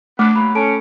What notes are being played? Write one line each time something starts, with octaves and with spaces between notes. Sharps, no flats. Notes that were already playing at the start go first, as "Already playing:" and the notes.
A3 B3 D4 D6
F#3 A#3 B5
C#4 A4 A5 D7